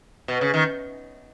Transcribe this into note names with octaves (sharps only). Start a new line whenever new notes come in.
B2
C#3
D#3